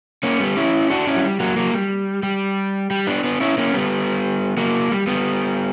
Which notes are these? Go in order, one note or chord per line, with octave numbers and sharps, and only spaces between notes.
A#3 C#4
G3 B3
C#4 E4
D4 F#4
C#4 E4
F#3
G3
F#3 A#3
F#3 A#3
G3
G3
G3
B3 D4
B3 D4
C#4 E4
A#3 C#4
G3 B3
F#3 A#3
G3
G3 B3